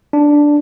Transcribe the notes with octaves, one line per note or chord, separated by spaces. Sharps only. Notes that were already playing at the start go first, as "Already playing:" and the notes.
D4